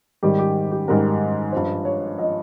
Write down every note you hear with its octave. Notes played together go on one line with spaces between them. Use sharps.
G#2 D#3 G3 G4
G4
G4
G#2 D#3 G3 A#4
G2 F3 C5
C#5
F3 D#5